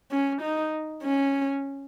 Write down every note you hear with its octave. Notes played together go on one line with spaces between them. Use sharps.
C#4
D#4
C#4